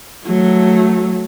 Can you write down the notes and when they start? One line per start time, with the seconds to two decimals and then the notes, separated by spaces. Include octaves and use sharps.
0.26 F#3 A3